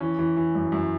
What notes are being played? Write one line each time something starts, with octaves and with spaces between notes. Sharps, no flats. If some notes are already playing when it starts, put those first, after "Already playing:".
E3 C#4
E3
E3
F#2
F#2